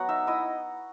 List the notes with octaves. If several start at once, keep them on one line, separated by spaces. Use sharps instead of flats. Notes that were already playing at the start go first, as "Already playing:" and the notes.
Already playing: F#3 B3 F#5 A#5 C#6
D#4 E5
E4 D#5